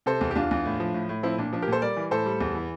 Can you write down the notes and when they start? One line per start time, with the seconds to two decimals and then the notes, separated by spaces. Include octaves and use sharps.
0.06 C3 A4 C5
0.21 E2
0.31 G4
0.35 E2 D4 F4
0.51 E2
0.65 A2
0.80 F3
0.94 A2
1.09 A2
1.23 F3 C4 E4
1.38 A#2 D4
1.53 F3 D4
1.62 G4 A#4
1.68 A#2 A4 C5
1.82 G3 A#4 D5
1.97 E3
2.11 A2 A4 C5
2.26 G3
2.41 E2
2.55 E3